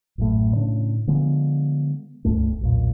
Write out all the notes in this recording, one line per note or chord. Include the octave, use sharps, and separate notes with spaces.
A1 F#2 A2
A2 C#3 D4
D3 F3 G#3 B3
D#1 C#2 G2 A3
B1 E2 A#2